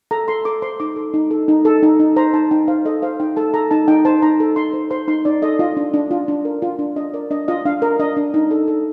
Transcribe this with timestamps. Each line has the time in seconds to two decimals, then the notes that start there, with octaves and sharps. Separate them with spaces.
0.11 A4 A#5
0.28 A4 C6
0.45 A4 D6
0.62 C5 C6
0.80 D#4 D6
0.96 A4
1.14 D#4
1.31 A4
1.48 D#4
1.65 A4
1.83 D#4
2.00 D#4
2.16 C5 A#5
2.33 D#4 A5
2.51 D#4 G5
2.68 C5 F5
2.85 A4 D#5
3.02 C5 F5
3.20 D#4 G5
3.36 A4 A5
3.54 A4 A#5
3.71 D#4 A5
3.88 D#4 G5
4.05 C5 A5
4.22 D#4 A#5
4.40 A4
4.56 D#4 C6
4.73 C5
4.91 C5 C6
5.08 D#4 C6
5.25 D#4 D5
5.42 A4 D#5
5.59 F4 D#5
5.77 D4
5.94 D4
6.11 F4
6.28 D4
6.45 A#4
6.62 F4
6.79 D4
6.96 D4 D#5
7.14 A#4 D5
7.31 D4 D#5
7.48 F4 D#5
7.65 D4 F5
7.82 A#4
8.00 D4 D#5
8.17 D4
8.34 D#4
8.51 A4
8.68 A4